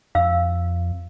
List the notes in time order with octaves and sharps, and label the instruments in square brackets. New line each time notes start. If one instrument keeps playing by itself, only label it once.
[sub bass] F2 [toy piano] F5 E6